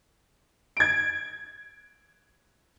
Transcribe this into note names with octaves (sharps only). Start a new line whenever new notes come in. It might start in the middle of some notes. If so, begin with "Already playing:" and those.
G#6 D7